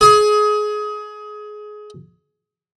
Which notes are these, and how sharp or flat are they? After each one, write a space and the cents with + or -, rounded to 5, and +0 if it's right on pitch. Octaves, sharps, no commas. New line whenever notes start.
G#4 +20